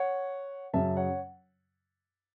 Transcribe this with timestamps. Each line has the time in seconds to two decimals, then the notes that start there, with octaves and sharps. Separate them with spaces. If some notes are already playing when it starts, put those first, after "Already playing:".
Already playing: C#5 F#5
0.74 F#2 C#3 F#3 E5 A5
0.97 C#5 F#5